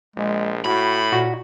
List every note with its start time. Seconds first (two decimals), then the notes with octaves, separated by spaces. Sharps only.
0.16 A#1 G#3
0.64 A2 F#4 B5
1.12 A#2 F#4